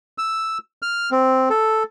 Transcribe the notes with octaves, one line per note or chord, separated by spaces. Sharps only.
E6
F6
C4
A4